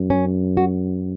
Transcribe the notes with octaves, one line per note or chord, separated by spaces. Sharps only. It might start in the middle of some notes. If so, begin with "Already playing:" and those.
Already playing: F#2
C#4
F#4